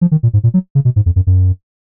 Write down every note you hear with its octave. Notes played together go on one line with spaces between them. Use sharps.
F3
D#3
A#2
G#2
A#2
F#3
C#3
B2
G#2
F2
F#2
F#2